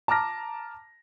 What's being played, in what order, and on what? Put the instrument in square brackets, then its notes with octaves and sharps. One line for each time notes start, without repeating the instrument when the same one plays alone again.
[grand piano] A5 A#5 D6 F6 A#6